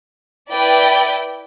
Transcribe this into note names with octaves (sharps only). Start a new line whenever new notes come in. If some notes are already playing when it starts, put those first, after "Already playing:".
E4 B4 D5 G5